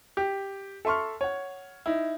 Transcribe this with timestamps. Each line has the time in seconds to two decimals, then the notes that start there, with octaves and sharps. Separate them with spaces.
0.17 G4
0.85 A4 E5 C6 C#6 F6
1.21 C#5 F#5
1.86 D#4 E4